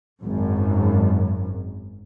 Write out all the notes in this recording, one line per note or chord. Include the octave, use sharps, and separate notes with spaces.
G#1 F#2